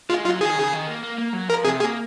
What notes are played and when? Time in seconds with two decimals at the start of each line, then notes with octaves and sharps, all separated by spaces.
0.10 G#3 F4
0.25 F#3 F4
0.41 D#3 G#4
0.56 C#3
0.72 D#3
0.87 A#3
1.03 A#3
1.18 A#3
1.33 F#3
1.49 F3 A#4
1.64 C3 G#4
1.80 A#3 G#4